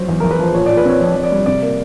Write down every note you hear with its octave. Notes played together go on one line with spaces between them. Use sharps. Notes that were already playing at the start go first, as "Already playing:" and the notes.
Already playing: F#3 C5
E2
A#4
E2
B4
F3 C5
A#2 C#5
A#2 D5
B4
C4 C#5
F2 C#5
F2
D5
G3
C3 D5
A#3